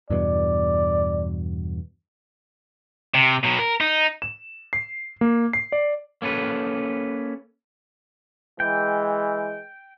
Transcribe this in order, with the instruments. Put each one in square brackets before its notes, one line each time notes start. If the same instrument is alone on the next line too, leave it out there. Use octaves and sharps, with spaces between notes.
[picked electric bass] E2 G2 B2 [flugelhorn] D5
[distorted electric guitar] C3
B2 F#3
A#4
D#4
[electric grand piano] E7
C7
A#3
C7
D5
[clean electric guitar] A#3 C#4 A4 B4
[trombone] E3 [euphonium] G#3 [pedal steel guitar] G5